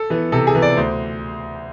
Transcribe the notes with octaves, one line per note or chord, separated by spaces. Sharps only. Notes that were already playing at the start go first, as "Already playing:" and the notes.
Already playing: A4
E3 B3
C3 A4
G#4
E3 B3
D5
D2 C5